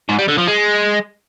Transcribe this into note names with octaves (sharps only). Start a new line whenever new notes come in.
G#2
G3
D3
F3
G#3